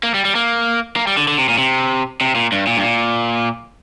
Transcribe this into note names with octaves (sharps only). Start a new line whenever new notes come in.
A#3
G3
G3
A#3
A#3
G3
D3
D3
C3
A#2
C3
C3
A#2
G2
A#2
G2
A#2